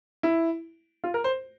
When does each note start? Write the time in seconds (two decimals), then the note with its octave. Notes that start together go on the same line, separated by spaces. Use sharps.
0.23 E4
1.04 F4
1.14 A#4
1.24 C5